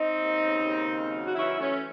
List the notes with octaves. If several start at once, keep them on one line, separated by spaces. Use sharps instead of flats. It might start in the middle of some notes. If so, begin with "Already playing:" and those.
Already playing: C4 D#4
D#2
C#3
D#2
C#3
F#3
F#4
E3 C#4 E4
E3 A3 C#4